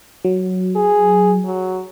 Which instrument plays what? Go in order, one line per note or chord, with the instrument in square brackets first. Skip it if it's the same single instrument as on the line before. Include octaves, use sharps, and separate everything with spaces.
[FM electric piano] F#3
[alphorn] G#4
F#3